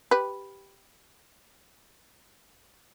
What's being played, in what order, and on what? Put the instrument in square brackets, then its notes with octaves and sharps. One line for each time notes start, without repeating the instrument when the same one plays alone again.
[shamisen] G4 B4